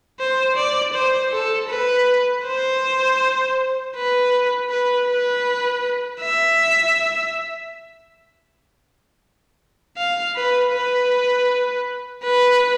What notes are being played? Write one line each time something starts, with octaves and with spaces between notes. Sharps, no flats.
C5
D5
C5
A4
B4
C5
B4
B4
B4
E5
F5
B4
B4
B4